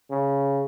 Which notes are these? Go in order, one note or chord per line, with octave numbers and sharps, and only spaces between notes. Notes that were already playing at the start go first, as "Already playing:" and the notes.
C#3